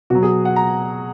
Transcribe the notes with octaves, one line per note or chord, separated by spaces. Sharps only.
B2 F#3 F#4
G#4
F#5
A#5